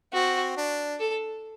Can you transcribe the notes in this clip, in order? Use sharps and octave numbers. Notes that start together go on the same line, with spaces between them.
C4 F#4
D4
A4